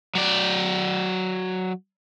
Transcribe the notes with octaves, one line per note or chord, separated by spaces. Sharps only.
F#3 D5